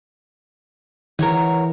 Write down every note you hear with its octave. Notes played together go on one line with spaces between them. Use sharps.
E3 A#4 C#5 F#5 A#5